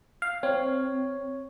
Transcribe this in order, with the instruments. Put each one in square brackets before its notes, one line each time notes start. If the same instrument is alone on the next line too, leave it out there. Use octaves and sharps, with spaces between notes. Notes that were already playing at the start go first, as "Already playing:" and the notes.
[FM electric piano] F5
[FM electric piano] C4 [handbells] C#5